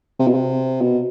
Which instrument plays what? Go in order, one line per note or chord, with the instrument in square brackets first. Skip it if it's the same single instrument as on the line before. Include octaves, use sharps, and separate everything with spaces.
[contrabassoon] C3
B2
C3
B2